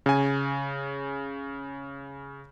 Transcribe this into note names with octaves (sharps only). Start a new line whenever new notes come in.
C#3 G#5